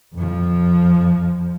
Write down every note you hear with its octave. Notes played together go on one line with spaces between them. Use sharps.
F2 F3